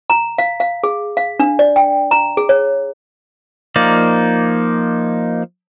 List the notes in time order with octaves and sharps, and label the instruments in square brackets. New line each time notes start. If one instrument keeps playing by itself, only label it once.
[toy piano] A#5
F5
F5
G#4
F5
D4
D5
G5
A#5
G#4
C#5
[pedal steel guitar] F3 A#3 D#4 D5